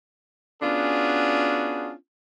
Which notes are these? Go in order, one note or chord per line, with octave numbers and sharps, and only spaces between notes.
B3 C#4 D4 F4 F#4 G#4